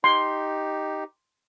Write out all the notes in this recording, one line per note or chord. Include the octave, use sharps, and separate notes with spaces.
D#4 G4 C6